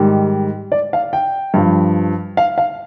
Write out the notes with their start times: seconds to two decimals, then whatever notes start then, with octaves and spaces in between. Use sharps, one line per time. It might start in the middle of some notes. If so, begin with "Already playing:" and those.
Already playing: G#2 D#3 G3
0.72 D5
0.93 F5
1.13 G5
1.54 G2 F3
2.37 F5
2.58 F5